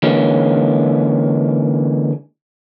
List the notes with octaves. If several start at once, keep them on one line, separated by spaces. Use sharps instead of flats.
D3 E3 G#3 A#3 C#4